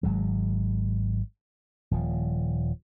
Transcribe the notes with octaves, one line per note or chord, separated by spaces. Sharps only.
G#1 F#3 G#3
D#1 F3